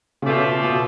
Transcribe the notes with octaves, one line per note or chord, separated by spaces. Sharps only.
C#3
B2 F3 A3 F4 A4 D5
B2